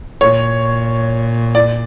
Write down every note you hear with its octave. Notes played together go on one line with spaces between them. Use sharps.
A#2 C#5
D5